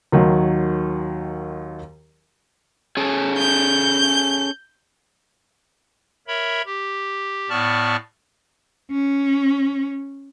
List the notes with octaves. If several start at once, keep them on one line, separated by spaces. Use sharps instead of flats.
D#2 D#3 F#3
C#4 G#4 A4
G6
A#4 C#5 E5 B5
G4
A2 B3 D5 A5 C#6 F6
C#4